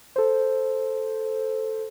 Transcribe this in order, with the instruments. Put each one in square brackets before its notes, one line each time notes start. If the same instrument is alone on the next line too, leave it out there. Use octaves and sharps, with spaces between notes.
[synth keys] A4 C5